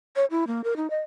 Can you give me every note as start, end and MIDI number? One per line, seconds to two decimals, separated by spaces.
0.16 0.25 73
0.31 0.47 64
0.47 0.61 58
0.64 0.74 70
0.76 0.90 63
0.90 1.01 75